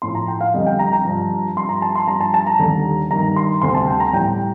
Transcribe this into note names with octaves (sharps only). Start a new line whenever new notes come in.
A2 F3 C6
A#5
G5
F5
F2 D3 G3 D#5
G5
A#5
A#5
G2 F3
G2 F3 C6
A#5
A5
C6
G2 F3 A#5
A5
A5
A#5
D#2 D3 G3
G2 D#3 G3 A#5
C6
D2 C3 G3 C6
A5
G5
A#5
A2 G3 G5